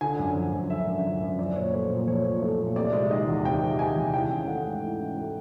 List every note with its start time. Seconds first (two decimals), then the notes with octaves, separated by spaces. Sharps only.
0.01 D3 G#5
0.19 F#2
0.35 F3
0.53 F#2
0.70 D3 E5
0.87 F#2
1.04 F3
1.21 F#2
1.39 F3 D5
1.56 A#2 C#5
1.73 A3 C5
1.90 A#2
2.07 F3 C#5
2.24 A#2
2.42 A3
2.59 A#2
2.76 C3 D5
2.93 G#3
3.11 D#3 D#5
3.28 E2
3.45 C3 G5
3.62 G#3
3.79 D#3 G#5
3.96 E2
4.13 E3 G5
4.31 C#4
4.48 A3 F#5
4.65 G#2
4.82 E3
4.99 C#4
5.17 A3